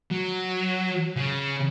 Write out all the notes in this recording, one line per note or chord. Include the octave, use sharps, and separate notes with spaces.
F#3
C#3